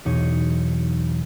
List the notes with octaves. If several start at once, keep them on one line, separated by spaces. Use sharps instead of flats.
B1 E2 D#4 C#5